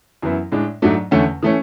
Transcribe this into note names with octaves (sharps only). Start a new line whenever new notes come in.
F#2 E3 B3 E4
A2 G#3 D4
G#2 F#3 A3 D4
E2 D3 A3 C#4
E3 A3 C#4